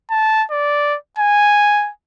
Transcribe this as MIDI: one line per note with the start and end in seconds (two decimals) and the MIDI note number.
0.10 0.44 81
0.51 0.96 74
1.18 1.90 80